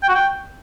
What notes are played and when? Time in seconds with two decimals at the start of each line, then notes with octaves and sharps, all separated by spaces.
0.03 G5
0.09 F#4
0.15 G5